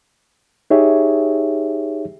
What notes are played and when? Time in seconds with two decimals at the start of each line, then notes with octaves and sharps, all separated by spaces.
0.70 D#4 G4 G#4 C#5 E5